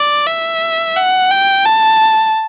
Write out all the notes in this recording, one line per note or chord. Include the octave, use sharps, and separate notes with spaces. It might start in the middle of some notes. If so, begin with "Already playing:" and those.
Already playing: D5
E5
F#5
G5
A5